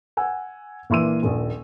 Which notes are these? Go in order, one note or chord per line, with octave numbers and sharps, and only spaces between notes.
F#5 G#5 E6
A#1 E3 A#3 C6 E6 D#7
D#1 A#1